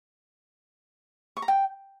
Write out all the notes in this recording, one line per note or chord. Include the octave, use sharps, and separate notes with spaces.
C#6
A#5
G5